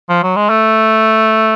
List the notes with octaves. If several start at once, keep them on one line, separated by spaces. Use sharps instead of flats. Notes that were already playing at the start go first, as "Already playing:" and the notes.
F3
F#3
G#3
A3